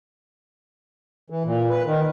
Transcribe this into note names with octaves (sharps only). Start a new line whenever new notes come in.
E3
A#2
B4
D#3